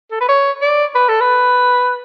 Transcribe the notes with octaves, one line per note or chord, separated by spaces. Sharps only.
A4
B4
C#5
D5
B4
A4
B4